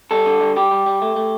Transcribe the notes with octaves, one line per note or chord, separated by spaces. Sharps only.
G3 A4
D3
G3
G3 G4
G3
G3
A3
A3